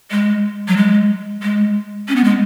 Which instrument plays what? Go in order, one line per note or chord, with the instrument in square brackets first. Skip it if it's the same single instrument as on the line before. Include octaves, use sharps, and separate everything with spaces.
[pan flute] G#3
F#3
G#3
G#3
C#4
B3
G#3